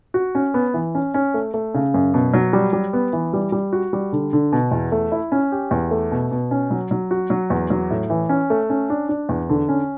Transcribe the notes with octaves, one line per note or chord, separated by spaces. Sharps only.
F#4
C#4
B3
E3
C#4
C#4
A3
A3
C#3
F#2
B2
F#3
G3
G3
B3
E3
G3
G3
F#4
G3
D3
D3
B2
E2
A3
E4
C#4
G4
E2
A3
B2
B2
C#4
F#3
F#3
F#4
F#3
E2
F#3
A2
E3
C#4
A3
C#4
D4
D4
E2
D3
C#4